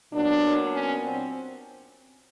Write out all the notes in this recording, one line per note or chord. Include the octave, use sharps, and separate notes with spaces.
A#2 F#3 B3 D4
C#4
C4